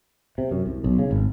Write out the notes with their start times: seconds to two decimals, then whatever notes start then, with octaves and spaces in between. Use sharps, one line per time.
0.38 C3
0.51 F#2
0.66 C2
0.84 B1
0.99 C#3
1.11 G#1